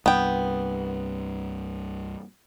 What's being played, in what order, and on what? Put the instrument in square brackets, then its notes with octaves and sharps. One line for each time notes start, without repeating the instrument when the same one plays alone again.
[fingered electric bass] C2 G2 [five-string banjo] B3 G5